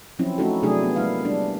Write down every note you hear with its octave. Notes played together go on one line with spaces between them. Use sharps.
F3 F#3 C4 C#4 E4
A3 C#4 D#4 E4 F#4 A4
C3 F#3 A3 D4 E4 G#4
B3
G#3 A#3 E4 F5
G3 D4